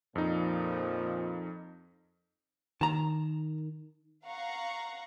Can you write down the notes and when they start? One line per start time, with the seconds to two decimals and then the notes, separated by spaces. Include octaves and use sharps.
0.15 F2 A#2 F3 D#4
2.81 D#3 A5 A#5
4.25 F5 F#5 A#5 C#6